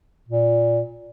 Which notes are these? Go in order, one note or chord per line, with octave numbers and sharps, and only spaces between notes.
A#2